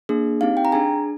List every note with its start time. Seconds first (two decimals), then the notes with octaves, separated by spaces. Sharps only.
0.09 A#3 D4 G#4
0.41 C4 D#4 G4 F5
0.57 G5
0.65 A#5
0.72 D4 G#4 G#5